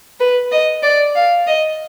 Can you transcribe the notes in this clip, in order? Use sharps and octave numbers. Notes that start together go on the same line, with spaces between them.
B4
D#5
D5
F5
D#5